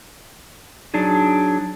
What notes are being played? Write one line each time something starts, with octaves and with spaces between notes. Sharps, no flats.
F#3 D4 D#4 G#4